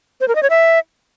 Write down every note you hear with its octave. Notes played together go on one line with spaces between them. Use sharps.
C5
A#4
D#5
C#5
E5